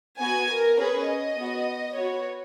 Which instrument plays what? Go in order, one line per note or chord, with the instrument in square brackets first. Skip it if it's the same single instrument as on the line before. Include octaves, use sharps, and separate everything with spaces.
[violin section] B3 F#4 G#5
A#4
C#4 G#4 B4
D#5
B3 F#4
B3 F#4 C#5